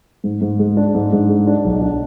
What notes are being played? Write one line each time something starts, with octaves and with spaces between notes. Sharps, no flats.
G#2
G#2
G#3
D4
G#2
G#2
G#3
D4
B1
D4